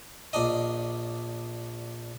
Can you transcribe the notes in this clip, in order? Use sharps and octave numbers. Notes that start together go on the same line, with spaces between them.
A#1 D4 D#5